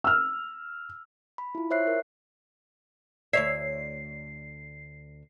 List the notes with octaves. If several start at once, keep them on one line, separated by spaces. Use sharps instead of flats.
E6 F6
B5
E4 F4
C5 C#5 E5 F#6 C7
A#4
D2 C#5 D5 E5 C7